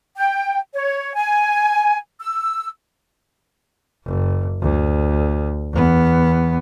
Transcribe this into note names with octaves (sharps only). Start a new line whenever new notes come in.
G5
C#5
G#5
E6
F#1
D2
E2 B3